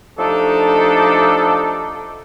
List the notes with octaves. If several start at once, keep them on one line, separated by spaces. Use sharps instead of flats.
F3 A3 D4 D#4 G4 A4